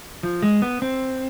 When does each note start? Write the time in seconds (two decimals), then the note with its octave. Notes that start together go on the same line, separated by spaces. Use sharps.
0.23 F3
0.42 G#3
0.62 B3
0.82 C4